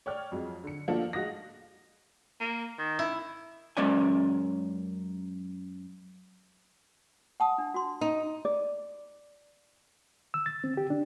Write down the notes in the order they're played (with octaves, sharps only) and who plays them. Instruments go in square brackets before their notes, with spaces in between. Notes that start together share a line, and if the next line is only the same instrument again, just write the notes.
[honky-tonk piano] C#5 D5 G5 C#6 F6
F2 F#3 G#3
D3 C#7
F3 A#3 D4 F#4 A4
G#3 F#4 F5 D#6 F#6 A#6
[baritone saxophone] A#3
D#3
[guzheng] E4
[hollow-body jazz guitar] F#2 G#3 C#4 D5 G#5
[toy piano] F#5 A5 D#6
D4
F#4 C6
[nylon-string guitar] D#4
[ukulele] D5
[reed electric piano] E6
A6
C4
G4
D4